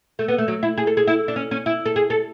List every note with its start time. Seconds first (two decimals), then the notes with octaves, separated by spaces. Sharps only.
0.19 A3
0.28 B3
0.38 A3
0.48 F#3
0.63 E4
0.77 G#4
0.87 A4
0.97 G#4
1.07 E4
1.28 D4
1.36 C#4
1.51 C#4
1.66 E4
1.86 A4
1.96 G#4
2.10 A4